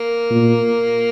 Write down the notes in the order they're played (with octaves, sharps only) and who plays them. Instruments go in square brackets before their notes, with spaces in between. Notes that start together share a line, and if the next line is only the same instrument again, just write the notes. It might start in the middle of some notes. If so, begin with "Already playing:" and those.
Already playing: [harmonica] A#3
[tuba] A#2